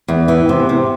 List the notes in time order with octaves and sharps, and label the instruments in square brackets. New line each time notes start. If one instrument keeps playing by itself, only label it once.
[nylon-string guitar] E2
E3
C3
C3